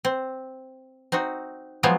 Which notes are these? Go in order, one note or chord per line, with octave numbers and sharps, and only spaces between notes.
C4
C4 D#4 F#4
F3 F#3 G#3 B3 C4